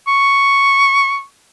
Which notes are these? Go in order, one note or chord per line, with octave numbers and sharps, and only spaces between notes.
C#6